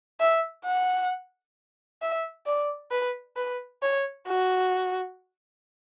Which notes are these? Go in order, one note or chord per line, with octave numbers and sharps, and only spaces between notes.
E5
F#5
E5
D5
B4
B4
C#5
F#4